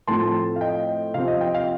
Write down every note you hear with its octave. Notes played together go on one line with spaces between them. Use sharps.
A2 F3 A3 C4 A5 C6
F5
D#5 G5
C3 F3 C4 F5
D#5
D#5 G5
F5